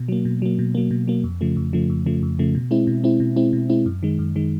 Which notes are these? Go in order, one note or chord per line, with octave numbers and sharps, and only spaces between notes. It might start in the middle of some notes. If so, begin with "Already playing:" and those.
Already playing: B2
F#3 A#3
B2
F#3 A#3
B2
F#3 A#3
B2
F#3 A#3
F2
C#3 F3 A3
F2
C#3 F3 A3
F2
C#3 F3 A3
F2
C#3 F3 A3
B2
G#3 C4 E4
B2
G#3 C4 E4
B2
G#3 C4 E4
B2
G#3 C4 E4
F#2
D#3 G#3
F#2
D#3 G#3